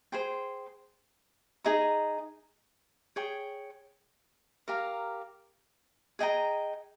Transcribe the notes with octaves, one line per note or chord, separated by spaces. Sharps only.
G#4 C5 G5 C6
D#4 G#4 D#5 A#5
G#4 C#5 G5
G4 A#4 F5 A#5
G#4 D#5 G5 A#5